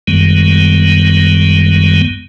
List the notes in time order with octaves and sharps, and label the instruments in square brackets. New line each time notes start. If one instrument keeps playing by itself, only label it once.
[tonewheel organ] F#2 D#3 G3 G#3 B3